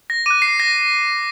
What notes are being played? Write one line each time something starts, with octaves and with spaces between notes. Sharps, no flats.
A#6
D6 F#6 D#7
C7
A#6